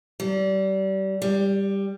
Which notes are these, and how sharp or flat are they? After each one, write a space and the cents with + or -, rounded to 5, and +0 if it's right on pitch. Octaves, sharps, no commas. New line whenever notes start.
G3 -30
G3 +10